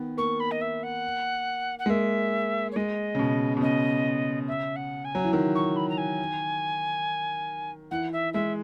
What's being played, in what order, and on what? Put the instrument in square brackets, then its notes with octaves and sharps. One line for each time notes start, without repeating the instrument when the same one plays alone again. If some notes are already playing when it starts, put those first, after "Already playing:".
Already playing: [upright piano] D#3 B3
[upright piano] A#3 [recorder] C#6
[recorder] B5
D#5
E5
F#5
F#5
[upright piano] G#3
[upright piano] A#3 [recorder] E5
[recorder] C#5
[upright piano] G#3 [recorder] D#5
[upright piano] C#3
B2
B2
[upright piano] C#3 [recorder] D#5
[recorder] E5
F#5
G#5
[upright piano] F#3
E3
D#3
[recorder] C#6
B5
A#5
G#5
[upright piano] E3 [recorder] F#5
[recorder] E5
[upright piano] G#3 [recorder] E5